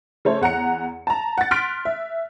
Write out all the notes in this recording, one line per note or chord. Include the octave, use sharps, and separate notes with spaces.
C#3 A3 A4 C5 C#5
E2 F#5 A#5 C#7
A5 A#5
F#5 A6
C6 F6 F#6 A6 B6 D7
E5